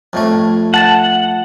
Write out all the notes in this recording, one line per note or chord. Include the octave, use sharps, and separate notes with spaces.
F2 A2 A3
F#5 A5 A6 E7